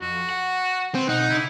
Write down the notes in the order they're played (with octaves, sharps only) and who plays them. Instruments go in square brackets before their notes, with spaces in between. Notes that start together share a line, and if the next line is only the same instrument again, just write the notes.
[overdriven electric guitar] F2 [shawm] F#4
[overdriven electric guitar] F#5
[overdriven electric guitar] B3 [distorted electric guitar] C4
[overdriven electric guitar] B1 [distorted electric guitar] D#4 [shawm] F#5
[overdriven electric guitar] C#3 D4 [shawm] E4